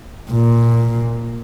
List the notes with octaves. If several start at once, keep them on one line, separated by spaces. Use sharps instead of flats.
A#2